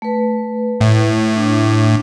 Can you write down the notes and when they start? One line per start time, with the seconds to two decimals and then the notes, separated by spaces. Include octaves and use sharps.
0.02 A3 B4
0.81 A2
1.36 D4